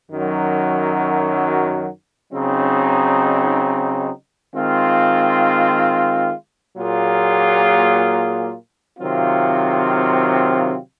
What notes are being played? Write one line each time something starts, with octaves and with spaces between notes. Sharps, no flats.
F#2 D#3 F#3
C#3 F#3 C4 D#4
D#3 G#3 C4 F4
A#2 F#3 A#3 F4 G#4
C3 D#3 F#3 C4 F4